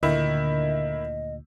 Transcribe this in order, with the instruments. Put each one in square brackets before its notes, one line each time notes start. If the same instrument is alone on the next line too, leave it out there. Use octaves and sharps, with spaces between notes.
[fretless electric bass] D2 A#2 [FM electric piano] D3 [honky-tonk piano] D#3 E4 [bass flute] D#5